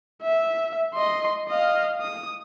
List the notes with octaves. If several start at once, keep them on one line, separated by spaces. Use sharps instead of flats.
E5
D#5 C6
D#5 F5
D#6